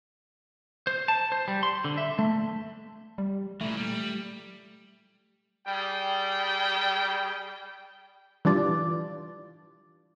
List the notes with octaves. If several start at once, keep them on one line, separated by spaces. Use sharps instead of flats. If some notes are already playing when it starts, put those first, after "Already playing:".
C5
A5
C5
G3
C6
D3
E5
A3
G3
A#2 E3 A3
G3
G3 G#4 G5
E3 G3 D4 F4 D5